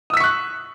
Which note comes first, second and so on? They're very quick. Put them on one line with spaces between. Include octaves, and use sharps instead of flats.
D#6 E6 B6 C#6 F#6